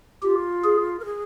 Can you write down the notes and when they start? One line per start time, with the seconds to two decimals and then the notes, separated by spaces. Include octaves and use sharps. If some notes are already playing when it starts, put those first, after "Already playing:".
0.23 F4 G4
0.64 G#4
1.00 A#4
1.05 G#4